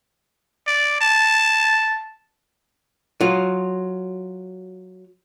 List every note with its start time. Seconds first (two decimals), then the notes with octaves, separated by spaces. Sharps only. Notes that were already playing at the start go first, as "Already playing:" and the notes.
0.67 D5
1.01 A5
3.21 F#3 F4